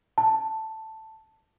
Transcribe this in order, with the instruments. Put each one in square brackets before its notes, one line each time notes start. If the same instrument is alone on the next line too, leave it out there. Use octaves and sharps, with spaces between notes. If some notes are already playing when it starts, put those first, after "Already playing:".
[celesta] A5